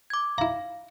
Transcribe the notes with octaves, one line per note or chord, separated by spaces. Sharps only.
D6 G#6
E4 F5 A#5